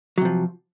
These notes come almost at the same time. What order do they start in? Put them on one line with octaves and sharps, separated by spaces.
F#3 C3 F3